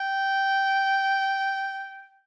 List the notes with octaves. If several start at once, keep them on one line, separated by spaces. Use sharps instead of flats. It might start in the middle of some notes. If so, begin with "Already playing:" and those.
Already playing: G5